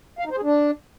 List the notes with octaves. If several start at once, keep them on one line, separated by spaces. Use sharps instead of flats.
F5
D#4
C5
G#4
D4